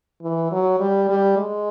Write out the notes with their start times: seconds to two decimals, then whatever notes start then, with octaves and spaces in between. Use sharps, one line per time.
0.23 E3
0.52 F#3
0.80 G3
1.09 G3
1.37 G#3